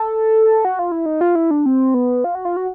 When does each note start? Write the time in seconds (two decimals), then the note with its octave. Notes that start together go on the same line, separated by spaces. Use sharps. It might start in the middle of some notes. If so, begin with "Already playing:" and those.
Already playing: A4
0.65 F#4
0.79 F4
0.92 E4
1.06 D#4
1.21 F4
1.35 E4
1.51 D4
1.66 C4
1.94 B3
2.24 F4
2.35 F#4
2.45 F4
2.57 F#4